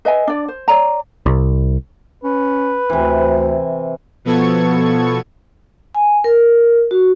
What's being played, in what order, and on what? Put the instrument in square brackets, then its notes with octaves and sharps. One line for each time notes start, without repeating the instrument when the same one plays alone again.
[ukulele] B4 D#5 E5 G#5
D4 D5
C5
C#5 D5 A#5
[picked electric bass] C2
[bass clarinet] C#4 [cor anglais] B4
[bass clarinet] D2 [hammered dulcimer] C3 E3
[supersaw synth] B2 F3 B3 A4 C#6 G#6
[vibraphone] G#5
A#4
F#4